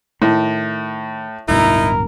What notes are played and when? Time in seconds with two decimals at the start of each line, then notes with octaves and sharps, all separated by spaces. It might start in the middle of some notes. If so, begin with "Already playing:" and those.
0.22 A2 D#3
1.49 D1 G2 B2 D#4 E4 A#4